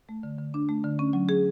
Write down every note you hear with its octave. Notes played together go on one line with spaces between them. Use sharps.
A3
D3
D3
D4
A3
D3
C#4
F#3
G#4